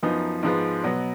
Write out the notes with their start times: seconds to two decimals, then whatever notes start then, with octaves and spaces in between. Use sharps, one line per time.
0.03 F#2 F3 B3 D#4
0.43 G#2 F3 G#3 B3
0.84 B2 F#3 B3